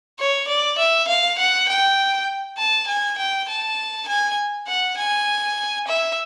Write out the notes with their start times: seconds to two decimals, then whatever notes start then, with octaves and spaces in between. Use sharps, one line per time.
0.19 C#5
0.48 D5
0.78 E5
1.08 F5
1.39 F#5
1.69 G5
2.58 A5
2.87 G#5
3.18 G5
3.48 A5
4.08 G#5
4.67 F#5
4.97 G#5
5.88 E5